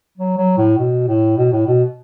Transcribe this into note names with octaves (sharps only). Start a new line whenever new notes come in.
F#3
F#3
A2
B2
A2
B2
A2
B2